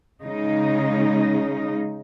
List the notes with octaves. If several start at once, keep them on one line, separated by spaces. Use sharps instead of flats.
C#3 G#3 D#4